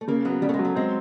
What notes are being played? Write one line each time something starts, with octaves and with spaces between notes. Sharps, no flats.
A3
C#3 A#3
F#3 B3
C#3 G3
A3
G#3
F#3
A3
G#3 C4